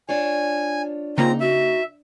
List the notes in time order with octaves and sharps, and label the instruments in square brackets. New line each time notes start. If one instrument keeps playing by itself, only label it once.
[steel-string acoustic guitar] D4 F4 C#5 [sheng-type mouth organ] G#5
[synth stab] C#3 A#3 [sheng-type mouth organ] C4 A#5 [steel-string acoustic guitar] D#4 [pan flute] F4
[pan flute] F#4 [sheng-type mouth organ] E5